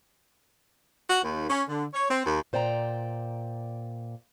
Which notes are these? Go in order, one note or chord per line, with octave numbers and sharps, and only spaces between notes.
F#4
D#2
C#4
D3
C#5
C4
D#2
A#2 C5 D5 G5 A#5